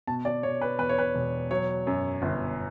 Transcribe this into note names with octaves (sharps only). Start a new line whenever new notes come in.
B2 A5
D5
B2 C#5
B4
E2 B4
C#5
B4
E1
F#3 C#5
F#2
G1